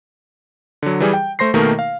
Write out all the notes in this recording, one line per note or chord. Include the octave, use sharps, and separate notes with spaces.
D3 F#3
E3 G3 G#4
G5
A3 C5 C6 A#6 C7
B2 D#3 A3 A#3 D#4 A#4
F5